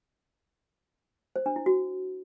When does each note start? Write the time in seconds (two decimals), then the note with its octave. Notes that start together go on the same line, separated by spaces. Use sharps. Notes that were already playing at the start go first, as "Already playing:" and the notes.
1.36 C5
1.46 D4
1.56 E4
1.66 F#4